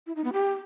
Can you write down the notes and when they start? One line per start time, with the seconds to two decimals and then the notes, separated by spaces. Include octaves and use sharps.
0.07 E4
0.15 D#4
0.24 B3
0.33 G4